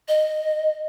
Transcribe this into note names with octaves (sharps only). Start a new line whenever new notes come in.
D#5